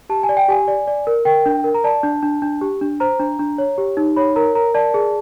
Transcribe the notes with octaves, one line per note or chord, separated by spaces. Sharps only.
G4 A5
G#5
D5
G5
G4 G#5
D5
D5
A#4
A#4 G5
D4
A#4
A#5
D5 A5
D4
D4
D4
G4
D4
C5 A#5
D4
D4
C#5
G4
D#4
C#5 B5
A#4 A#5
A#4 A#5
D5 A5
G#4